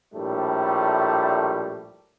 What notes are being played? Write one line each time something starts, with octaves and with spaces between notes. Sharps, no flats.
A#1 A2 G3 A3